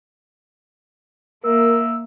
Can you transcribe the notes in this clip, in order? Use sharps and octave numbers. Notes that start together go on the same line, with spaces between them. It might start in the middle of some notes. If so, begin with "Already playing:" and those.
A#3 A#4 E5 E6